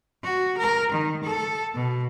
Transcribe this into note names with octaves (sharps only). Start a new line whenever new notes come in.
F#4
A#4
D#3
A4
B2